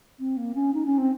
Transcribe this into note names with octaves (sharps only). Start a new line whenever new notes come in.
C4
A#3
C#4
D#4
C#4
C4